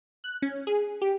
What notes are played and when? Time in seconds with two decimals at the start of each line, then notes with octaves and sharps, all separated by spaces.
0.24 F#6
0.42 C#4
0.67 G#4
1.02 G4